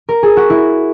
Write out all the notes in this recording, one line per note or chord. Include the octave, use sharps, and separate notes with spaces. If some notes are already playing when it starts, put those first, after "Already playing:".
A#4
G#4
F#4
E4